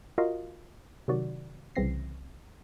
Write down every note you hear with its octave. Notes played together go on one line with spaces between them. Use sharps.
F4 F#4 A#4 D#5 F5
C3 D#3 F#3 F#4 D5
C2 C#3 E3 C4 A#6 C7